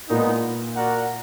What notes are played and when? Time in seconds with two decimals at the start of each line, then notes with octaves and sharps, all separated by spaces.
0.09 A#2 G#3 B3 D#4
0.76 F#4 A#4 D5 F#5